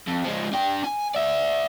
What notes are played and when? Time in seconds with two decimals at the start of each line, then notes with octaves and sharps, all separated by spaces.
0.07 F2
0.24 F3 G#3
0.53 D4 G5
0.84 G#5
1.15 D5 E5